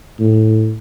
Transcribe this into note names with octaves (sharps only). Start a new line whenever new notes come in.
A2